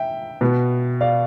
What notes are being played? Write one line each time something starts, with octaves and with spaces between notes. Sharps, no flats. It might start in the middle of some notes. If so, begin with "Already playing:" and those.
Already playing: E5 G5
B2 B3
D5 F5